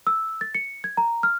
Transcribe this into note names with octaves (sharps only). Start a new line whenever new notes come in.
E6
A6
C#7
G#6
A#5
F6